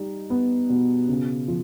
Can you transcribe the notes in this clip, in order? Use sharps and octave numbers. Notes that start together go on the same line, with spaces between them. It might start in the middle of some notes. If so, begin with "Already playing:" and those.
Already playing: G3 D#4
B3
B2
C#3
F3